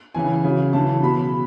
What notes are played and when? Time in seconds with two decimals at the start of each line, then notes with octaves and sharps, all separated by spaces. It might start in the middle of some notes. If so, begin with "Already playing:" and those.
0.15 C#3 E3 G#5
0.44 C#3 F#3
0.73 C#3 E3 A5
1.02 B2 F#3 B5